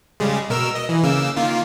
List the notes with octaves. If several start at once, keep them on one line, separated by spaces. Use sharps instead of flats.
C#3 G3 G#3
B2 A#4 E6
D#5
E3
C#3 A#3 E6
D#3 A#3 F4